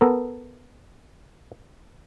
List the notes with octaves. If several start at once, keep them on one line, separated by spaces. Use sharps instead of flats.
B3 A4 A#4